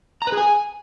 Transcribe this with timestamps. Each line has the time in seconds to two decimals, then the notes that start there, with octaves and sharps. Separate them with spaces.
0.22 A#5
0.27 B4
0.32 G#4
0.38 G#5